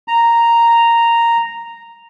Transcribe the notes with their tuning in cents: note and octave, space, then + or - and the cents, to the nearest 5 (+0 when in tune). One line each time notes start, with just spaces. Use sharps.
A#5 -5